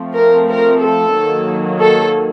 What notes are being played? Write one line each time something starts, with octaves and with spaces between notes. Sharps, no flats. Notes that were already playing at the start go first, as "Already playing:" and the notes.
Already playing: F3 A3 C4
A#4
A#4
A4
D#3 F#3 A#3
A4